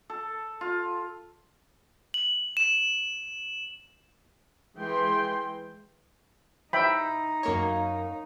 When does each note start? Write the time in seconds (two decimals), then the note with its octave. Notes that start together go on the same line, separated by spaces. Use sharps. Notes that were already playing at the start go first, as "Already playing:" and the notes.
0.10 A4
0.61 F4
2.14 F#7
2.57 E7
4.77 E3 G#3 G#4 G5 C6
6.73 D#4 E5 G5 B5
7.43 F#2 A#3 C#5